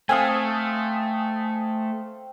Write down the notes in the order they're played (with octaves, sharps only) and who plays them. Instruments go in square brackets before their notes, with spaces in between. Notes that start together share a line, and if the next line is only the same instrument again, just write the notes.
[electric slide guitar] A3 [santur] C4 F5 [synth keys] G#5 D#6